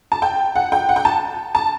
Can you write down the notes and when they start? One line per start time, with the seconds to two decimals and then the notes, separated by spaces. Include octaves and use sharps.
0.12 A5
0.22 G5
0.55 F#5
0.72 G5
0.89 F#5
0.96 G5
1.05 A5
1.55 A5